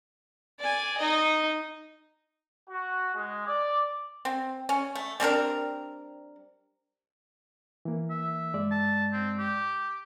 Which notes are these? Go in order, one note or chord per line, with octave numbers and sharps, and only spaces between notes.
D5 G#5
D#4 D#5
F#4
G#3
D5
C4
C#4
A3
G3 C4 D4 A#4
E3 A#3
E5
G2 G#3 D5
A5
C4
G4